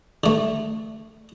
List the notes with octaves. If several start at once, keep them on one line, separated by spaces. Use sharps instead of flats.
D3 A3